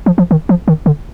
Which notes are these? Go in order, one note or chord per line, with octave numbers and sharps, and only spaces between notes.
F3
F3
D#3
F3
D#3
D3